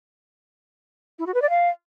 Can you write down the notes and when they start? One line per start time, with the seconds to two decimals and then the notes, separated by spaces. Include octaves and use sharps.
1.19 E4
1.26 F#4
1.34 B4
1.42 D5
1.50 F5